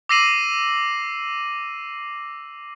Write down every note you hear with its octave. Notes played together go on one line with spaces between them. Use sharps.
D6 E6 A#6 C7 D#7 F#7